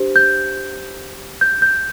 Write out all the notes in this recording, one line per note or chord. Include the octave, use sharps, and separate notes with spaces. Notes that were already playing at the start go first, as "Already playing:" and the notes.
Already playing: D4 G4 C5
G6
G6
G6